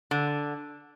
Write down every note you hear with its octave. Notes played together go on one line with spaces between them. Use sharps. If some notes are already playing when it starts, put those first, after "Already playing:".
D3